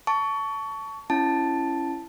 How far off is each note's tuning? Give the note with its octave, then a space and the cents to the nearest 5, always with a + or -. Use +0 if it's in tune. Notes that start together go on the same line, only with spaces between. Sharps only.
A5 +5 C#6 +25
C#4 -15 E4 +20 A5 +0